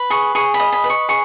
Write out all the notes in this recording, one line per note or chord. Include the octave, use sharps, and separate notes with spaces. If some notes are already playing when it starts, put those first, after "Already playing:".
Already playing: B4
G#4 C#6
G#4 C#6
B5
D#5
B5
B4
C#6
G#4 C#6